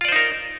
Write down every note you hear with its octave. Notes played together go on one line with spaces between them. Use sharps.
D#4 F4 A#4 C5 D5